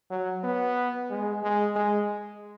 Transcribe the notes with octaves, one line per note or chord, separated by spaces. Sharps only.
F#3
B3
G#3
G#3
G#3